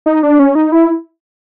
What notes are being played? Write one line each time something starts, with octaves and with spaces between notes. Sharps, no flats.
D#4
D4
C#4
D#4
E4